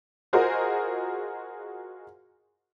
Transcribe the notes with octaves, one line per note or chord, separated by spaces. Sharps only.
F4 F#4 G#4 A#4 C5 D#5